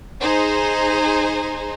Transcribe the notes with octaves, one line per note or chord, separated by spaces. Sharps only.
D#4 G#4 C5